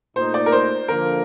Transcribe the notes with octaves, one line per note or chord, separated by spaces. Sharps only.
A#2 A3 D#4 C5
D5
A#4
C5
D3 F3 A#3 A#4